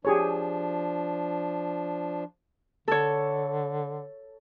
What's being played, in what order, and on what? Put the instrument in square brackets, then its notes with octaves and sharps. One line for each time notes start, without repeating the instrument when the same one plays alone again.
[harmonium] F3 D4 [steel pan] G4 G#4 C#5
[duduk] D3 [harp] A4 C#5